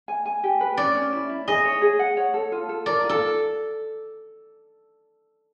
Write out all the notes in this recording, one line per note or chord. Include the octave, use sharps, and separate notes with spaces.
G#5
G#5
G4
B4
C#4 D5
C#4
E4
E4
G#4 D#5
C#5
G#4
F#5
C#5
A4
F4
A4
A#4 D5
F4
A4